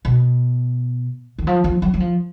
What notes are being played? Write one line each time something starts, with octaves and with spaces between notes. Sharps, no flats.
B2
D#3
F3
F3
F#3
F#3
F3